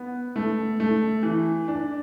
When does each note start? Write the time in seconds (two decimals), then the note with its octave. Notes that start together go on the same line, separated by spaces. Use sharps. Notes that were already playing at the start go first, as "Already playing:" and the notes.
Already playing: B3
0.36 A3
0.80 A3
1.23 E3
1.68 D4